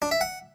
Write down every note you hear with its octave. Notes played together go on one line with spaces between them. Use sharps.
D4
E5
F#5